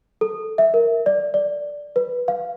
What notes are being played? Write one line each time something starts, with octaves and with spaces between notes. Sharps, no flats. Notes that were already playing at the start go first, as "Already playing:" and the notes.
A4
E5
A#4
D5
D5
B4
F5